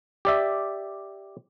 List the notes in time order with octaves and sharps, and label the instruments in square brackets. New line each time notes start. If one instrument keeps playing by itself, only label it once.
[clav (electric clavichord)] G4 D5 E5